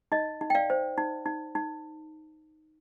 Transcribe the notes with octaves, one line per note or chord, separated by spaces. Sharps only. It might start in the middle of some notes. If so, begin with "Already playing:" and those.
D#4 D#5
D#4
G5
D5 F5
C5
D#4
D#4
D#4